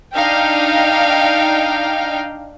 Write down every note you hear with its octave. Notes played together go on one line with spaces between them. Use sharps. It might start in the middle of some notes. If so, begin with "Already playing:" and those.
D4 D#4 F5 G5